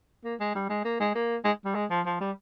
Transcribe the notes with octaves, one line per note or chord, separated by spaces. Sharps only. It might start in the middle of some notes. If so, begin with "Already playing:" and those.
A#3
G#3
G3
G#3
A#3
G#3
A#3
G#3
G3
G#3
F3
F3
G3